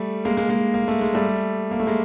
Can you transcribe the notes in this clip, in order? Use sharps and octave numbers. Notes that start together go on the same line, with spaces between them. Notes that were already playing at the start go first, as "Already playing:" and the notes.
Already playing: G3 A3
G#3 A#3
G#3 A#3
G#3 A#3
A#3
A3
G#3
G3 A3
A#3
A3
G#3 A#3